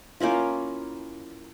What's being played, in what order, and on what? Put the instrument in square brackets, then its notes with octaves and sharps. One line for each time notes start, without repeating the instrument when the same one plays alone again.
[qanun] A#3 C#4 E4 F4